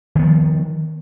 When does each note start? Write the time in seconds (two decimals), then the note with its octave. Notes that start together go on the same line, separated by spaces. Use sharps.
0.15 D#3
0.19 B3
0.22 F3